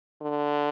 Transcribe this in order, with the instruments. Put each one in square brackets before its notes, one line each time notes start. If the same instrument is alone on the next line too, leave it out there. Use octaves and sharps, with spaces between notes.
[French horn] D3